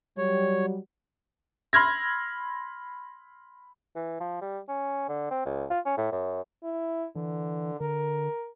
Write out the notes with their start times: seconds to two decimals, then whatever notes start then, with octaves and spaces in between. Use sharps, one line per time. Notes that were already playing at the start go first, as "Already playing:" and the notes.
0.18 F#3 G3 C#5
1.73 B5 C6 F6 G#6 A#6
3.95 E3
4.20 F3
4.41 G3
4.68 C#4
5.09 D3
5.31 C4
5.46 C#2
5.70 F4
5.86 C#4
5.97 A2
6.12 F#2
6.63 E4
7.16 D3 E3
7.80 D3 A#4